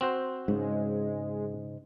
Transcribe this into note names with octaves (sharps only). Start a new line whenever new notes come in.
C4 F#4 C5
G#2 C#3 G#3